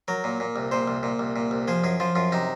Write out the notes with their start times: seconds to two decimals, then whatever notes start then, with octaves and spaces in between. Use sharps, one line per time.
0.08 F#3 A#4
0.24 A#2
0.40 A#2
0.56 C2
0.72 A#2 C5
0.88 C2
1.03 A#2
1.19 C2
1.36 A#2
1.51 C2
1.68 F3 G#4
1.84 F#2 G#4
2.00 F3 F4
2.15 F#2 F4
2.32 C3 D#4